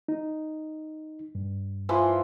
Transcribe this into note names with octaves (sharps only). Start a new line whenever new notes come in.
D#4
G2
E3 F3 F4